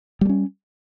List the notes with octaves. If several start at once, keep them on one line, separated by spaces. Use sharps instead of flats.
G3 A3 C#4